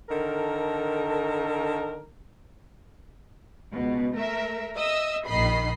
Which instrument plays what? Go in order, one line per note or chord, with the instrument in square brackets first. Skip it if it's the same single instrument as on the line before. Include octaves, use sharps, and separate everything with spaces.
[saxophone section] D3 D#3 A4 A#4
[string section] C#2 B2
A3 A#4 E5
D#5 E5 D#6 E6
A#1 D#3 D#5 B5 C7